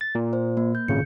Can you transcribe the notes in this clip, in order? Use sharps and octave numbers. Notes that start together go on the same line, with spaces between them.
A6
A#2
C5
A#3
G6
G#1 A#2 C#3 C#7